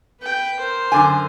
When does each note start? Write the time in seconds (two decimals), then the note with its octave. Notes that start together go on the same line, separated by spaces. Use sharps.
0.21 B4 G5
0.60 A#4 C5
0.92 F#2 D3 G#5